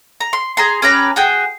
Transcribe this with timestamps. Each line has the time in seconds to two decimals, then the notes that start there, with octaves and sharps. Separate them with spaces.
0.21 A#5
0.33 C6
0.57 G#4 A#5 C6
0.82 C#4 G4 B4 A#5
1.16 F#4 G#4 G5